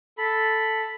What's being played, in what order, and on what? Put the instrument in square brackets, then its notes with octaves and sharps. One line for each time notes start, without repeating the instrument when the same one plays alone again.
[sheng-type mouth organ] A4 B5